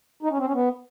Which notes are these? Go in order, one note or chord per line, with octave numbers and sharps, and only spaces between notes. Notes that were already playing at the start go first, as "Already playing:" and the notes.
D#4
C#4
C4
C#4
B3